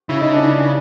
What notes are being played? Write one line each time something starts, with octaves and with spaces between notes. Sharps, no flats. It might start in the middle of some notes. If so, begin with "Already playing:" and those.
C#3 E4
D#4
D4
D4